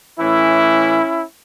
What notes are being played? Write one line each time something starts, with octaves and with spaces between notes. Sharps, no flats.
A2 E3 C#4 E4